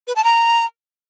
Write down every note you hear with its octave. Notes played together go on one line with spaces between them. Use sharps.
B4
A5
A#5